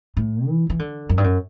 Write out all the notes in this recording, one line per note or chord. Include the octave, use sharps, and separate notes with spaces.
A2
E3
E3
D3
F#2
G2
F#2